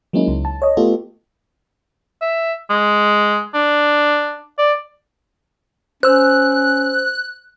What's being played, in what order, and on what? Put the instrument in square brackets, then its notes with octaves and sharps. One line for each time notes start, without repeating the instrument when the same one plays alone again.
[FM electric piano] F#3 G#3 A#3 C#4 D#4 E4
C#2
A5
C#5 D#5
A3 B3 F4 G4 A4
[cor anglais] E5
G#3
D4
D5
[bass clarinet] C#4 [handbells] C5 E6 [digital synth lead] F#6